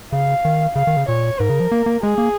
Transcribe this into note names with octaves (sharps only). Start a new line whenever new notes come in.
C#3 F5
D#3
C#3 F5
D#3
C#3
A#2 C#5
G#2 A#4
C#3
F3
A#3
A#3
G#3 G#4
A#3